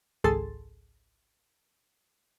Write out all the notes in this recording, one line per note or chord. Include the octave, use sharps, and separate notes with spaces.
G#1 C#2 G#4 A4 C6 A6